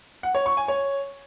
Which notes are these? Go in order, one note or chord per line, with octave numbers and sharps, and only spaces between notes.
F#5
C#5
C#6
G#5
C#5